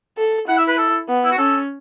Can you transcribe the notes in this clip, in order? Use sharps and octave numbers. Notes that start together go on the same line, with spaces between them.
A4
E4 F#5
E5
B4
A4
B3
E4
F#4
C#4 A4